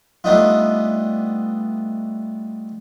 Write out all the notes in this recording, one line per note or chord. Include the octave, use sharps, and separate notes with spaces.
G3 A3 B3 D4 D#4 F4